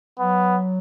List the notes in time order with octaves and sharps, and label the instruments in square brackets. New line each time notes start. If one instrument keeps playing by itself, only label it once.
[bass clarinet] F#3 [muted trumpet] B3